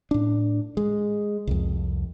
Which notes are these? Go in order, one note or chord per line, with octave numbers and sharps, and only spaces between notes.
A2 D4
G#3
C2 F2